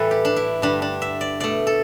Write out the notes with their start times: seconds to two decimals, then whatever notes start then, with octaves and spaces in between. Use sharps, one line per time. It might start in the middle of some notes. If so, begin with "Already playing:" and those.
Already playing: A2 E3 G3 A3 A4 B4
0.11 G4
0.25 D4
0.36 E4
0.62 G2 D3 G3 D4
0.82 D4
1.02 E5
1.21 D5
1.40 B2 A3 D5
1.67 A4